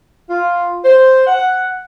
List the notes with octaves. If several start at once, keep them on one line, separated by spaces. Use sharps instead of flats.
F4
C5
F#5